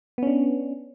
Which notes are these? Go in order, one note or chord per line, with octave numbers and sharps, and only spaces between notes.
B3 C#4 D4